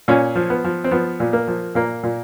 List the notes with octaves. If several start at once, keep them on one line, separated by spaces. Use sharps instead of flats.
A#2 C#4
F3
B3
F3
C4
F3 B3
A#2
A#3
F3
A#2 A#3
A#2